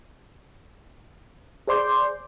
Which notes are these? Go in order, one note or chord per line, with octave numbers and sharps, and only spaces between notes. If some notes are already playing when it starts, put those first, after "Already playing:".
G#4 C5 D5 C6 D6 G6